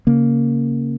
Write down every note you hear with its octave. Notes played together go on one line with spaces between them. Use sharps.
C#3 A#3